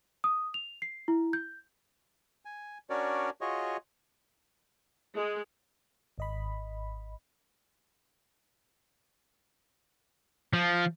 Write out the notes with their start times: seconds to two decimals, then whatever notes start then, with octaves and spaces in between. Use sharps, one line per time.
0.24 D#6
0.54 F7
0.82 C7
1.08 E4
1.33 G6
2.45 G#5
2.90 C#4 D4 F#4 A#4 C#5 D5
3.41 F4 F#4 G#4 C#5 D#5
5.14 G#3
6.18 G#1 D#5 B5
10.53 F3